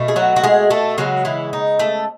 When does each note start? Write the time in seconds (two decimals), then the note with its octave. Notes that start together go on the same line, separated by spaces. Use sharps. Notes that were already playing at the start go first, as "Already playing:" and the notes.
Already playing: B2 A3
0.08 G#4
0.16 F#3 F#4
0.36 F#4
0.43 G#3 G#4
0.70 A3 A4
0.98 C#3 F#3 G#3 B3 F#4
1.25 E3 E4
1.53 D#4
1.79 A3 A4